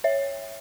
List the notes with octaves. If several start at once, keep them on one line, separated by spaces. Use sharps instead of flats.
C#5 E5